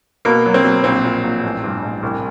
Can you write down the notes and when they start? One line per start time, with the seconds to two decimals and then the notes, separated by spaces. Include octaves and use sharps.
0.25 B2 A#3
0.46 F#3
0.54 C4
0.64 F#3
0.84 A#1 C4
1.05 A#2
1.24 A#1
1.43 A1
1.64 G2
1.83 A1
2.03 C2